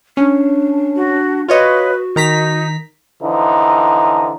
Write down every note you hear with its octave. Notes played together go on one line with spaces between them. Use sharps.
C#4 D4
F#4
F4 F#4 B4 C#5 D#5
D#3 D#4 A#5 B6
D3 E3 F3 D#4